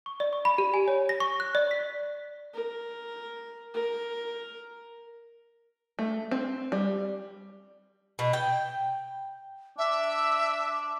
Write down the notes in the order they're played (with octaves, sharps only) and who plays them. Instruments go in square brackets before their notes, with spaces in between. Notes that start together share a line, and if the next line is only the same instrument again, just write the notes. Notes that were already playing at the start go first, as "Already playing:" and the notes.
[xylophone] C#6
D5
C#6
B5
G4
G#5
C#5
A#6
C#6
F#6
D5
B6
[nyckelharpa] A#4
A#4
[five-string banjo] A3
C4
G3
[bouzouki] B2
G5
[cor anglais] D4 [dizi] E5